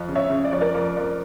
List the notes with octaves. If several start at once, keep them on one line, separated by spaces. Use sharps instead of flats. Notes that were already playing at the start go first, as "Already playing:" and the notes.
Already playing: F2
C#3
C#5 E5
C#3
D5
F2 C#5
A#4 D5
F2
F2